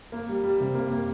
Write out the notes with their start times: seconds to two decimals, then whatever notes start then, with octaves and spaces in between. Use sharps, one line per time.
0.12 A#3
0.29 G3
0.43 G3
0.60 C3
0.75 A#3
0.91 A#3